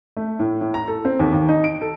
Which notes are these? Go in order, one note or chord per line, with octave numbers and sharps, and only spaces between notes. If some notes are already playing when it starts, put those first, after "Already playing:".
A3
A2
A2
A#5
A4
C4
D#2
D#2
D#4
D7
A4